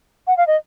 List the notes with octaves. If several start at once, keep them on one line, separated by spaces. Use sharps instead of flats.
F#5
F5
D#5